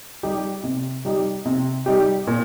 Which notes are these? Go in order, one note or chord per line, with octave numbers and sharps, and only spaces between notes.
G3 D#4 G4
C3
G3 D#4 G4
C3
G3 D#4 G4
A#2